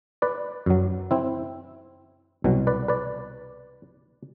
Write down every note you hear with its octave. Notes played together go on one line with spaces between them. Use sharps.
B4 D5
F#2 F#3
C4 E4
C2 B2 F#3
B4 D5
B4 D5